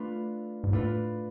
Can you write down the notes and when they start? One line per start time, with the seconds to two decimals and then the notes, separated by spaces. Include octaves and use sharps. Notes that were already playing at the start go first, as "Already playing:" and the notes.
Already playing: A3 D4 F4 B4
0.64 G#2
0.73 A2 A3 D4 F4 B4